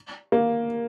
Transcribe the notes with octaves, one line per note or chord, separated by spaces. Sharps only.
A#3